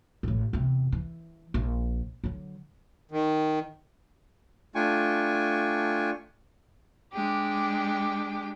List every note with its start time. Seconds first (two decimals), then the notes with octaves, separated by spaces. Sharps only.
0.23 A1 A2
0.53 E2 C3
0.92 E3
1.54 A#1
2.24 D3 F#3
3.11 D#3
4.75 A3 D4 F4 G5 G#5 C#6
7.13 G#3 D4 G4 G5